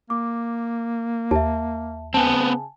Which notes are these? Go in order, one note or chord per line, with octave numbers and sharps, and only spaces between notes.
A#3 D6
D#2 E5 A5
C#3 B3 C4 G#5 A5